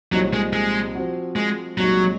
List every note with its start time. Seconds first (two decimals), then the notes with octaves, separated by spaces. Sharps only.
0.12 C2 A#2 F3 F#3 C4 D#4
0.33 G#3
0.53 G#3
0.95 F3 C4 F#4
1.36 G#3
1.78 C2 A#2 F#3 G#3 D#4